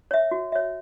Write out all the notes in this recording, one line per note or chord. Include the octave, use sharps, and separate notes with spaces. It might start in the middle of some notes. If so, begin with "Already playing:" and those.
C#5 E5
F#4
C#5 E5